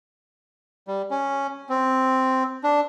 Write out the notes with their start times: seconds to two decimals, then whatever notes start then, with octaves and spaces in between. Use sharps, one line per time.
0.88 G3
1.11 C#4
1.69 C4
2.64 D4